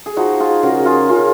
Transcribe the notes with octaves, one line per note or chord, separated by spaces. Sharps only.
G#4
F3 D#4 F#4
F4 G#4
C#3 F#4 A#4
F#4
F4 G#4
C#3 C#4 F4